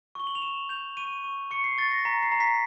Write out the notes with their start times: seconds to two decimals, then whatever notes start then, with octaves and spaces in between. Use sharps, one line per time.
0.15 C#6 G7
0.27 F#7
0.35 F7
0.42 C#6 E7
0.69 G6 F7
0.97 C#6 D#7
1.24 C#6
1.51 C#6 C#7
1.64 C7
1.78 C#6 A6
1.91 A#6
2.05 A#5 B6
2.23 C7
2.32 A#5
2.40 B6